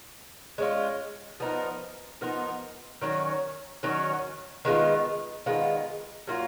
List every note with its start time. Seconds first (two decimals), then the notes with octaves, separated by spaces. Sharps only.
0.58 G#3 C#4 F4
1.40 F3 B3 D#4 A#4
2.21 F3 B3 D#4 A#4
3.01 D#3 F#3 C#4
3.83 D#3 F#3 C#4
4.65 D#3 G#3 B3 F4
5.46 D#3 G#3 B3 F4
6.27 F#3 A#3 F4